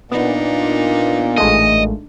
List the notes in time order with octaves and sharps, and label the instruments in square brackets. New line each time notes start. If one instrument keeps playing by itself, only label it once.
[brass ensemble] A#2 [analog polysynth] B3 [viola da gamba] D4 D#4
[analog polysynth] A1 G#3 A3 [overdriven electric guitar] D#5